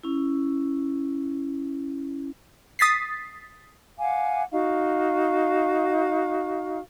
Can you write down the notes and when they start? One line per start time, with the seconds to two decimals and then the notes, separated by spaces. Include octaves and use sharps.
0.03 C#4 E4
2.79 D#6 A6 B6 C7
4.00 F5 F#5 G#5 D6
4.51 D#4 F#4 F5